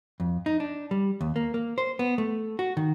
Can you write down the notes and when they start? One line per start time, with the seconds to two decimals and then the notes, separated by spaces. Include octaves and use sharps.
0.20 F2
0.46 D#4
0.60 D4
0.91 G3
1.21 D#2
1.36 A#3
1.54 A#3
1.78 C5
1.99 B3
2.18 A3
2.59 F#4
2.77 D#3